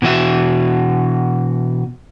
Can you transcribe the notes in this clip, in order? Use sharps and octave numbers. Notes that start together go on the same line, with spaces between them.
B2 E3 F#4 E5